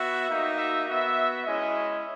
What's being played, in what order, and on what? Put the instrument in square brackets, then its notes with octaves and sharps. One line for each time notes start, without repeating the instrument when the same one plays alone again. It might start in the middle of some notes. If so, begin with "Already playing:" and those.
Already playing: [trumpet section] B3 F#4 E5
A#3 D#4 F#4
E5
B3 F#4 E5
G#3 C#4 E4 D#5